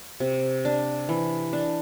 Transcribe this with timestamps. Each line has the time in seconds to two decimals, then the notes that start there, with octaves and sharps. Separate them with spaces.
0.20 C3
0.65 D4
1.09 E3
1.53 D4